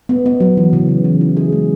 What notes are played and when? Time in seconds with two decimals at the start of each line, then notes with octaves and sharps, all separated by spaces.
0.09 B3
0.26 B3
0.40 F#3
0.57 E3
0.73 C#3
0.89 B3
1.05 E3
1.21 E4
1.37 G#4
1.52 G#3